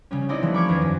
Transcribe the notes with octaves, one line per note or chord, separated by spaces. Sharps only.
C#3 G3 C#4
C4 C#4 D#4 E4 D5 D#5
E3 F3 G3 A3 A#3
B5 C#6 D6 F6 G#6 B6
E2 D#3 C5 G#6 B6
F#2